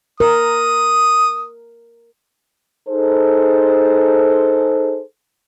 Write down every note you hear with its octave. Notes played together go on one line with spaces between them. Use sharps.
A#4 D#6
D#4 G#4 A4 C5